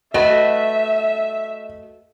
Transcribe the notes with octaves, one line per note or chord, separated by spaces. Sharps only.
A3 F#4 B4 D#5 E5